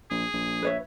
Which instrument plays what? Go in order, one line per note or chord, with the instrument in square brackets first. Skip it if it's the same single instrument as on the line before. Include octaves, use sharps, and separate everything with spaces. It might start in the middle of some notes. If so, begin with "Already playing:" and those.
[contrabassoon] A#1 [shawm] G#4
[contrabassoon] A#1
[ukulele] B4 C#5 E5